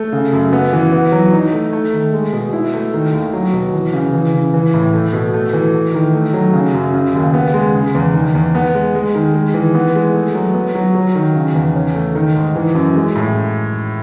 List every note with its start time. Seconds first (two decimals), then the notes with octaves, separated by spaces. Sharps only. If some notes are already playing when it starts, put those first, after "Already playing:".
Already playing: A3
0.12 C#3
0.33 F#2
0.53 B3
0.73 E3
0.92 B3
1.12 F#3
1.33 D#4
1.52 A3
1.73 A3
1.93 D#3
2.13 G#3
2.33 B2
2.53 E4
2.74 A3
2.94 D#3
3.13 D#2
3.33 F#3
3.53 B2
3.74 E3
3.93 C#3
4.14 E3
4.34 C#3
4.54 E3
4.74 A2
4.93 A3
5.13 B2
5.34 A3
5.53 E3
5.74 A3
5.94 D#3
6.13 A3
6.33 F#3
6.53 C#3
6.74 F#2
6.93 C#3
7.14 D#2
7.34 B3
7.54 G#3
7.75 C#3
7.95 E2
8.14 D#3
8.35 E2
8.55 B3
8.74 G#3
8.95 G#3
9.15 D#3
9.34 G#3
9.54 E3
9.75 B3
9.95 G#3
10.14 A3
10.34 F#3
10.54 B3
10.75 F#3
10.95 F#3
11.15 D#3
11.35 C#3
11.55 E2
11.75 C#4
11.95 A3
12.15 D#3
12.36 G#2
12.56 E3
12.75 F#2
12.96 G#3
13.15 A2